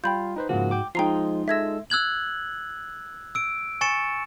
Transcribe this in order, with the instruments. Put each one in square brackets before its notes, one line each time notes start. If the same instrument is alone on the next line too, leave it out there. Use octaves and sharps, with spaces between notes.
[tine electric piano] G3 F4 [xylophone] G5 B5 G6
[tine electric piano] D#4 B4 C5
[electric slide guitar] G#2 F#4 [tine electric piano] C#3 F3 A#3
[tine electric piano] G5 D6
[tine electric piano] F3 G#3 [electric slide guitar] D#4 F4 [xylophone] G5 A#5 C7
[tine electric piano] G#3 A4 E6 [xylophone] E5 G#6 A#6
[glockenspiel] E6 F#6 G#6 F#7
E6 D7
G#5 C#6 A6 C#7 E7